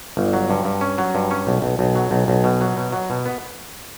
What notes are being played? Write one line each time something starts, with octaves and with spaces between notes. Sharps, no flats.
G1
F#3
G2
G2
C#4
F#3
G2
C#4
B1
B1
B1
F#3
B1
B1
B2
F#3
B2
F#3
B2
B3